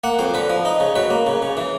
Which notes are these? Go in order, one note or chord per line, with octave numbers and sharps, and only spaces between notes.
A#3 F#5
F2 C5
D3 B4
F3
D#4
C#3
F#3 B4
A#3
C#3
C#3
E3